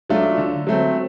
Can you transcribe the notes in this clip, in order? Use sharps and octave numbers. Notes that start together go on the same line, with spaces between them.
F#3 A3 D4 F4
D3
F#3 A3 C4